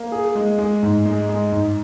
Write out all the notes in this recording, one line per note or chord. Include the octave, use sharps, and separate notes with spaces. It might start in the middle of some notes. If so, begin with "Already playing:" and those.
Already playing: A#3
G#4
G#3
G#3
G#2
G#3
G#3
G#2